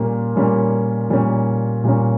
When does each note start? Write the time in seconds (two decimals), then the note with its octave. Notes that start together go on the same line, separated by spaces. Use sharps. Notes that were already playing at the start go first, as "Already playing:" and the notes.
Already playing: A#2 G3 A#3 C#4
0.36 A#2 G3 A#3 C#4
1.10 A#2 G3 A#3 C#4
1.84 A#2 G3 A#3 C#4